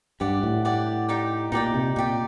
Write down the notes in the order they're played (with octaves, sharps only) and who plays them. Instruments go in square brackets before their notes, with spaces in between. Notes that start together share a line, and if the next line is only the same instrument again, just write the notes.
[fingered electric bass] G2 [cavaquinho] G4 D5 F#5
[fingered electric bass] A2
[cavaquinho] G4 D5 F#5
D#4 G4 D5 G5
[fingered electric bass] A#2 [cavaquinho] D#4 G4 D5 G5
[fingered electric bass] C3
[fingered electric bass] A#2 [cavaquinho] D#4 G4 D5